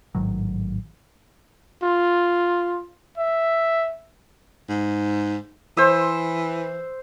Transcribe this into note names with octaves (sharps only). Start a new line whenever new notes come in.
A1 G#2 D#3 F#3
F4
E5
G#2
E3 C5 E6